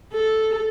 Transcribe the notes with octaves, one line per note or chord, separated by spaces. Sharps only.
A4